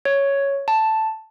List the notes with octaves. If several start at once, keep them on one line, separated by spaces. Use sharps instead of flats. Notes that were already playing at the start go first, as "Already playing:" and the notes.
C#5
A5